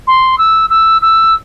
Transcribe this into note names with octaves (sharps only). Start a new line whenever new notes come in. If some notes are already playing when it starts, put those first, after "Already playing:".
C6
E6
E6
E6